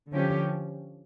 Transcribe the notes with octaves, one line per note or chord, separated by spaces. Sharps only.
D3 F3 C#4 G4